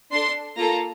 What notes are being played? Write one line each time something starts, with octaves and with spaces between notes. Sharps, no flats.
D4 A4 C6
A#3 F4 A4 A#5